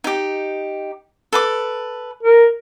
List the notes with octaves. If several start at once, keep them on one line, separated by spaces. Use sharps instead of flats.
D#4 G4
A4 B4 D6
A#4